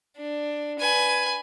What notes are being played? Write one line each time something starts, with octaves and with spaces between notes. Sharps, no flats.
D4
B4 G#5